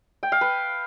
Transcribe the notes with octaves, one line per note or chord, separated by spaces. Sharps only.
G5
F5
B4